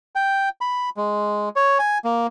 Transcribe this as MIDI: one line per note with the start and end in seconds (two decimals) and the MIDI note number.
0.15 0.49 79
0.61 0.89 83
0.97 1.49 56
1.56 1.78 73
1.79 1.98 80
2.05 2.27 58